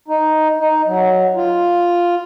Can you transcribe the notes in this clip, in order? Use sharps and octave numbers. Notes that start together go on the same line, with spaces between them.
D#4
D#4
F#3
F4